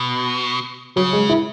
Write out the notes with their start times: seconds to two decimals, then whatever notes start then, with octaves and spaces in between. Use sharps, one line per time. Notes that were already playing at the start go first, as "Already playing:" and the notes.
Already playing: B2
0.96 C#3 F#3
1.13 G#3
1.29 E4